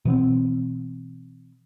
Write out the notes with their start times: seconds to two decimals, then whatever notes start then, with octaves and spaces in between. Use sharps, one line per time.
0.05 B2 E3 B3 C4